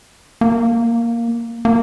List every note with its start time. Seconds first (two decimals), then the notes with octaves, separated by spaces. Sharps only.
0.41 A#3
1.65 A#3